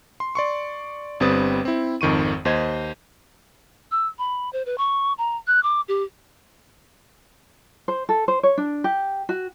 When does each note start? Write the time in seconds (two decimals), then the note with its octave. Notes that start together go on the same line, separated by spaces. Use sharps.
0.20 C6
0.35 D5 C6 C#6
1.20 G1 G3 C4 B4 D#6 A6
1.65 C4 E4
2.01 G#1 F2 D#3 C#6 D#7
2.45 D#2 C5 D#5 G#6
3.92 E6
4.18 B5
4.53 C5
4.66 B4
4.78 C#6
5.18 A#5
5.47 F#6
5.63 D6
5.88 G4
7.88 C5
8.09 A4
8.28 C5
8.43 C#5
8.58 D4
8.84 G4
9.29 F#4